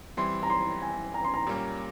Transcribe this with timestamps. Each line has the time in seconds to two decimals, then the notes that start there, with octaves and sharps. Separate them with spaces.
0.17 E3 G3 C4 E4 C6
0.43 A#5
0.50 C6
0.82 G#5
1.14 A#5
1.24 C6
1.34 A#5
1.47 A#2 G3 A#3 C#4